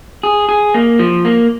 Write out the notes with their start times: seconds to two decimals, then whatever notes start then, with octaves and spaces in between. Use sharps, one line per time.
0.23 G#4
0.49 G#4
0.74 A#3
0.99 F3
1.25 A#3